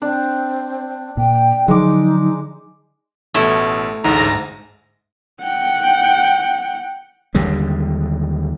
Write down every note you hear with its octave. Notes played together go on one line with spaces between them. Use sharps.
C4 D4
A#2 G5
D3 F3 F#3 G#3 D#4 D6
A1 B2 A3 E4
A1 D2 G#2 A#5 A#6
F#5 G5
D#2 D3 G3 G#3